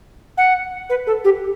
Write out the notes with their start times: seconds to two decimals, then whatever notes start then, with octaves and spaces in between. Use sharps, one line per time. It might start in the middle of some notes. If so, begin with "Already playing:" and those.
0.38 F#5
0.90 B4
1.07 A4
1.24 G4